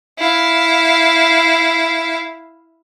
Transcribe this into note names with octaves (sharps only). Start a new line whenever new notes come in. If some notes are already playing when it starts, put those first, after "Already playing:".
E4 F5